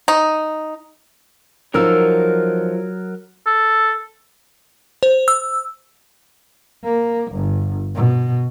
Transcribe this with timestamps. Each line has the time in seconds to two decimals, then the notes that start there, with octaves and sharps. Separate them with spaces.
0.08 D#4
1.74 F3 F#3 D#4 A#4 E6
3.47 A4
5.03 C5
5.28 E6
6.84 A#3
7.32 G1
7.95 B2